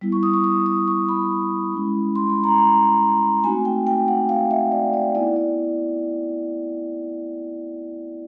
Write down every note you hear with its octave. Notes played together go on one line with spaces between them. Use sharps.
G3 B3 E4
C#6
D#6
C#6
D#6
D#6
C#6
B5
G#3 C#4 E4
C6
B5
A#5
A#5
A3 C4 D#4 F#4 G#5
G5
G5
F#5
F5
E5
D5
D5
B3 E4 D5
D5